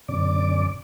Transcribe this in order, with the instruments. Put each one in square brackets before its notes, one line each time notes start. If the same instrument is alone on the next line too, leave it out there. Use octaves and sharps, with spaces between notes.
[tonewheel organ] F#2 B2 D3 C#4 D5 D6